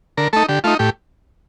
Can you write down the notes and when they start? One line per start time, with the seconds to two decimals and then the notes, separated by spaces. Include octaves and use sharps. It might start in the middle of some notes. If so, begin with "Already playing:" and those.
0.17 D3 A#4
0.33 A3 D#4 A4
0.49 D3 G4
0.64 A3 D#4 F4
0.79 A2 G4